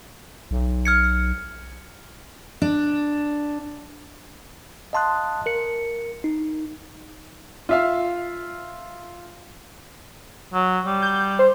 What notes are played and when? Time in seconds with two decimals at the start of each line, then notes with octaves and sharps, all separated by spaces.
0.51 B1
0.85 F6 G#6 C#7
2.62 D4
4.93 D#5 F5 A5 C6 D#6 F#6
5.46 A#4 C#7
6.24 D#4
7.69 F4 E5 F5
10.54 F#3
10.85 G3
11.02 G6
11.39 C5